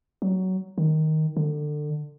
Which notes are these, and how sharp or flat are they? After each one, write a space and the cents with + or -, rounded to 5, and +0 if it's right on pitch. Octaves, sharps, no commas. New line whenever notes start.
F#3 +15
D#3 +5
D3 +25